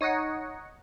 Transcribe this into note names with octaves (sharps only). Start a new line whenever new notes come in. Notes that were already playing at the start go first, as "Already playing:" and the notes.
D#4 C#5 D#5 F#5